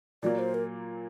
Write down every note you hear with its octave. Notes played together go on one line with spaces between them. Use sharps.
A#2 F#3 A#3 D5
C5
A#4